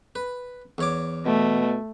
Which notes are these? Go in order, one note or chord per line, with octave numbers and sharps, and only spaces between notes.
B4
E2 C#5 D6
B2 A3